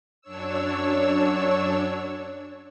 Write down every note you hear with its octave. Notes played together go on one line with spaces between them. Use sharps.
F#2 D4 C#5 E6